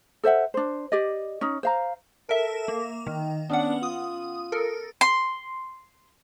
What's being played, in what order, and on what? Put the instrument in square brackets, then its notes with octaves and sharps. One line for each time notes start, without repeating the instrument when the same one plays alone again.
[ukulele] A4 C5 E5 F#5
D4 C5
G4 D5 D#5
C#4 D#4
C5 F5 A#5
[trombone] A4 [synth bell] A#4 E5
[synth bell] A#3
[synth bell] D#3 [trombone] D#4
[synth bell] B3 C#4 F#5 [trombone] D4
[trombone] F4 [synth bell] D#6
[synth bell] A4 A#4
[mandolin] C6